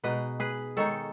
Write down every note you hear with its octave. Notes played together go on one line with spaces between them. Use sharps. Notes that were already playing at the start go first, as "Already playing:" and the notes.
B2 G#3 D#4 B4 D#5
G#4 B4
D#3 G#3 D#4 A4 C#5